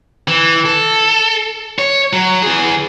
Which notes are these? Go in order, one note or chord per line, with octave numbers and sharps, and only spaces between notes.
E3
A4
C#5
F#3
E3 G#4